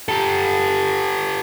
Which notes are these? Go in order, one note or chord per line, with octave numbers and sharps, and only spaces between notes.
G4 A4